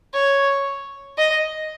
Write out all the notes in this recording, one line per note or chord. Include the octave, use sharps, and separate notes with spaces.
C#5
D#5